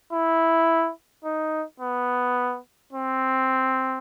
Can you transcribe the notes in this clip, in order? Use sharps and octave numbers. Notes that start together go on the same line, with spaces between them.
E4
D#4
B3
C4